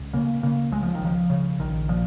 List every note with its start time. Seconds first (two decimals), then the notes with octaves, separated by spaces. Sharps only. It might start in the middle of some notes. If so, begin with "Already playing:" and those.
Already playing: C#2
0.13 C#3 A#3
0.43 C#3 A#3
0.71 C#2 G#3
0.83 F3
0.94 D#3
1.01 C#2 F3
1.30 C#3
1.59 A#1 D#3
1.89 A#2 F3